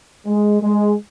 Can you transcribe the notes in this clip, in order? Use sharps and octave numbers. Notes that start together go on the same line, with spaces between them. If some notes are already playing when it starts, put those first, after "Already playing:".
G#3
G#3